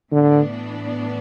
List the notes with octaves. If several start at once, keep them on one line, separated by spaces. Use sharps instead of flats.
A2 D3 E3 B3 D4